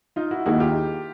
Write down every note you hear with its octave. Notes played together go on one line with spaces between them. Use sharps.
D#4 F4
E4 F#4
D#2 D#3 G#3 E4 F#4
F4 G4